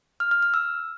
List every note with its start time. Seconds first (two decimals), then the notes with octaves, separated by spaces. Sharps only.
0.20 F6
0.31 F6
0.43 F6
0.54 E6